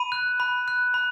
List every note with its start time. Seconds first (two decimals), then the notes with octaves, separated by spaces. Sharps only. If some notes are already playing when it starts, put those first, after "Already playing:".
Already playing: B5 D#7
0.12 F#6
0.40 B5
0.68 F#6
0.94 B5